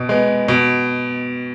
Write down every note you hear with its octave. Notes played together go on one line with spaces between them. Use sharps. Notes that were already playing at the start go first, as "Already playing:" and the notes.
Already playing: B2
G#3 B3
B2